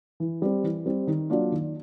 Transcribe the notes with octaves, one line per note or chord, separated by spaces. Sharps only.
E3
G3 C4
E3
G3 C4
D#3
F#3 A#3 D4 F4
D#3